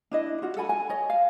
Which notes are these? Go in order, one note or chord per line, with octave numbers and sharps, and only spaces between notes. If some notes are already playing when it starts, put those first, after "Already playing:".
D4 E4 D#5
F4 F#4
A4 F#5 G#5 B5
G#5
C#5 D#5
F5